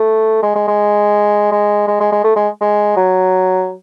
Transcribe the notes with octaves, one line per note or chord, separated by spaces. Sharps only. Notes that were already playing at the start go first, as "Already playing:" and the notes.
Already playing: A3
G#3
G#3
G#3
G#3
G#3
G#3
G#3
A3
G#3
G#3
F#3